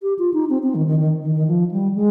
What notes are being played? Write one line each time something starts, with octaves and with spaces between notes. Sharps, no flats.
G4
F4
D#4
C4
C4
D#3
D#3
D#3
D#3
D#3
F3
G3
G#3